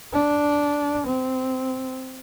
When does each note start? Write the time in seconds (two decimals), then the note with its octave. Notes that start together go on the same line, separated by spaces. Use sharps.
0.13 D4
1.06 C4